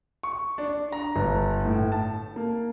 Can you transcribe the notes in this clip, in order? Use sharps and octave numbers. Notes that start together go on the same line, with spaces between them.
C#6
D4
A#5
G1
A2
A5
A#3